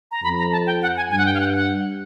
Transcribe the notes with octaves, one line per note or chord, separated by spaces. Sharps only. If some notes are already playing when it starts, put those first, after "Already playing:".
A#5
F2 B5
A#5
A5
G5
F#5
G#5
G2 G#5
F#5
G5
F5
F#5
F#5